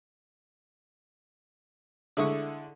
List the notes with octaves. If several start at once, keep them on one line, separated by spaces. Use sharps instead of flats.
D3 G#3 E4 A4 C#6 D#6